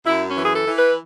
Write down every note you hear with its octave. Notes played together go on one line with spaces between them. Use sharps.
F#2 E4
C#4
E3
G#4
A4
E3
B4